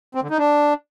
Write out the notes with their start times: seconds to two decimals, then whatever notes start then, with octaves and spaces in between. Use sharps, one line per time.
0.15 C4
0.23 D3
0.31 D#4
0.38 D4